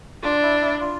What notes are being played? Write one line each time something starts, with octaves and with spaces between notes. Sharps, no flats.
D4 F4
E4
E4
F4